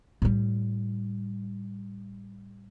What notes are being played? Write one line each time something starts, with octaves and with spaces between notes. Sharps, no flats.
A2 G3